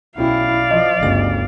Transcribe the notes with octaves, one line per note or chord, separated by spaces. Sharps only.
B1 C#4 E4 D5 F5 G5
F3 D#5
G1 D2 C#3 A6